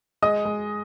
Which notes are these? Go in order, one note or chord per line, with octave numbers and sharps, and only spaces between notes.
G#3 D#5 D#6
G#3